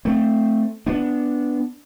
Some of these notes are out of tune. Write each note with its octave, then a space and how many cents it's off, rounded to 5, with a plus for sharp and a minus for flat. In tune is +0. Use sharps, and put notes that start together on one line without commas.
A3 +0 C4 +0
B3 +0 D4 +0